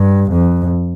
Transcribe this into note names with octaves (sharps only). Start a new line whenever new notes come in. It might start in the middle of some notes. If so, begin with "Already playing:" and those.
Already playing: G2
F2